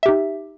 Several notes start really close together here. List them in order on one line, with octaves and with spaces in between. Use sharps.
E5 G4 D#4